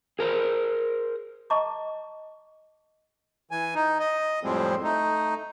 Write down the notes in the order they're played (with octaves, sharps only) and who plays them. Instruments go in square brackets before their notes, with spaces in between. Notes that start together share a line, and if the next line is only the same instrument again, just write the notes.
[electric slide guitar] G#4 A#4 C5
[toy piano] D#5 A5 A#5 C#6 D6
[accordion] E3 G#5
D#4
D#5
F2 A2 F3 G3 G#3 C4
A3 D#4